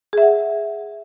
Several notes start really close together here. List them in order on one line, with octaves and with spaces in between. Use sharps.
G#4 E5 F#5